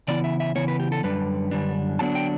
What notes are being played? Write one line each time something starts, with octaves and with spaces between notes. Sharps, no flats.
C#3 E3 B3 E4 D5
E5
E5
C#3 E3 B3 E4 C#5
B4
G4
A4
F#2 D3 G3 D4 B4
F#2 D3 G3 D4
D3 F#3 B3 D4 A5
G5